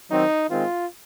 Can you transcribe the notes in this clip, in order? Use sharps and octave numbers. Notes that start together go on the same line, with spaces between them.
D#3 F#3 C4 D#4
D#3 G#3 C4 F4